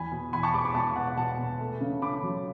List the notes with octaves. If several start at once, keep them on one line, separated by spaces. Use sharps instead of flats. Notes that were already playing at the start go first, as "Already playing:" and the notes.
Already playing: E2 G#5 B5
B2
E2 G#5 B5
A5 C#6
G#3 B5 D6
B5 D6
B2 A5 C#6
B3 F#5 A5
B2 F#5 A5
B2
A3
C#3
C#3 B5 D6
F#3